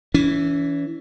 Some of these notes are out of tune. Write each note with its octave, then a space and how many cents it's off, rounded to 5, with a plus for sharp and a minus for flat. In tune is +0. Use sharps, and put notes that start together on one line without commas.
E3 +0 C#4 +35